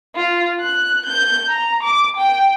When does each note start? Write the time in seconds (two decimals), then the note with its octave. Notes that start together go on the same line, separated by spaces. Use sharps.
0.16 F4
0.60 F#6
1.06 G6
1.49 A#5
1.83 D6
2.17 G5